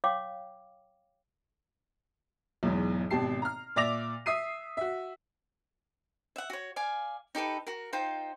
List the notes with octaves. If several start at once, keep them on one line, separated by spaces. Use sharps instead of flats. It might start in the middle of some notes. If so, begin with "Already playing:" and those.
C#5 F5 G5 D6
B1 E2 G#2
G#1 B2 G4 A5 C7
A#5 F6
A#2 D5 E5 D6 A#6 F7
E5 D#6 C7 D#7
F#4 E5
E5 F#5
F#4 C#5
D5 F5 G#5
D#4 G4 A4 B4
F#4 A#4
D#4 F4 C5 G5